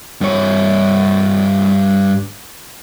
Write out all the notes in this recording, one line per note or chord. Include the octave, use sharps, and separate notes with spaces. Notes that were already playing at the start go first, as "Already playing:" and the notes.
G2 C#5